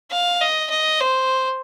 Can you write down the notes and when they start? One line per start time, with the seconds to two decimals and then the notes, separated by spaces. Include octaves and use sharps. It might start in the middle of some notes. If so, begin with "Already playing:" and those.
0.11 F5
0.41 D#5
0.70 D#5
1.00 C5